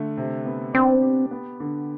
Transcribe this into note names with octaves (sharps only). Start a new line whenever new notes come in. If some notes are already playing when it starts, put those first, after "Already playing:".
Already playing: D3 A3
C3
B3
C4 D4
G4
B3
D3